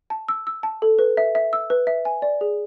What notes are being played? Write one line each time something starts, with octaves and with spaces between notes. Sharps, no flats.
A5
E6
E6
A5
A4
B4
E5
E5
E6
B4
E5
G#5
D5
G#4